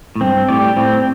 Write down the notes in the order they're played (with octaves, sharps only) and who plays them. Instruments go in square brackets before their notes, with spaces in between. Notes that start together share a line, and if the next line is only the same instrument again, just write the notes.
[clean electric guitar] A2
[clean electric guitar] G2 [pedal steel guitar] C4
[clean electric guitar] A2 [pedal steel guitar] G4 D5
[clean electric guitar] A2 [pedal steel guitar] C4